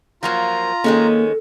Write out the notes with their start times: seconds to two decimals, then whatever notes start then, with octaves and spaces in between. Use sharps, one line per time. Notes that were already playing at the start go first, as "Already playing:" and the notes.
0.23 F3 F#3 A#3 F4 A#5
0.84 D#3 G#3 A#3 C#4 A4